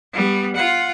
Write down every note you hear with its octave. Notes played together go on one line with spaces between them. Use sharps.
G3 B3
F4 F#5